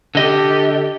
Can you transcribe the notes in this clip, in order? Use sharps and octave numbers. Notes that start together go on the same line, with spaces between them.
D3 G4 A4 D#5